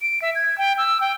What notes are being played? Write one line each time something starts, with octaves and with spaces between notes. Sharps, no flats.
D7
E5
G#6
G5
E6
G5